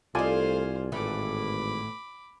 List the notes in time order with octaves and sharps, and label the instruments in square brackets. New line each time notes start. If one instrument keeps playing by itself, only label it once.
[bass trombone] C2 [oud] A3 D#4 [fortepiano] F4 D5 G#5 [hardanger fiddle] C5 F5
[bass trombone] G#1 [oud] A2 E3 A3 [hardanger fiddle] B5 D6